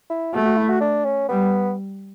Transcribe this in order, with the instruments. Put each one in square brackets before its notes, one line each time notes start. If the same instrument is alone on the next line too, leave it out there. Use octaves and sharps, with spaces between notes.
[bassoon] E4
[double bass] A3 [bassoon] F#4
[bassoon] F#4
E4
F#4
D4
C#4
[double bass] G3 [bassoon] B3